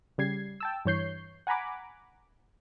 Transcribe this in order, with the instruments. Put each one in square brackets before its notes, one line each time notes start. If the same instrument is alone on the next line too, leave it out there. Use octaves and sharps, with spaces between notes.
[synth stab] C#3 G3 G#6 C7
G5 A5 E6
G2 E3 C#5 G6 C7
F#5 G#5 A#5 B5 D6